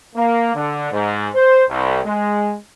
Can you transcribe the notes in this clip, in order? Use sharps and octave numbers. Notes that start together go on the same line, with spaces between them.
A#3
D3
G#2
C5
C2
G#3